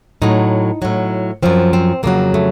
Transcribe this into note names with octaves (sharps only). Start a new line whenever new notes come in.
A2 F#3 D#4
A2 F#3
F#2 F3 C4
C4
F2 C#3 F#3 A#3
A3